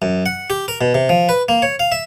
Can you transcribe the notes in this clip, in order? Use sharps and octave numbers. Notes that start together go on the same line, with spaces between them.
F#2
F#5
G4
A#4
B2
C3
F3
B4
A#3
C#5
F5
E5